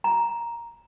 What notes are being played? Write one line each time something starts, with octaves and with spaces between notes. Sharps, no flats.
A#5